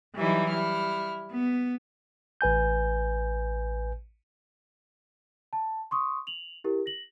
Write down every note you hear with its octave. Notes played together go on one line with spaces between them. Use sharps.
E3 F#3 G3 D#4 E4
G3 E4 F6
B3
A1 B4 G#5 G6
A5
C6 C#6 D#6
F7 F#7
E4 G4 A#4
A#6 F#7